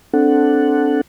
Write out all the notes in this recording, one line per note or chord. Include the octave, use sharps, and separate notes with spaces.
C4 D4 A4 F#5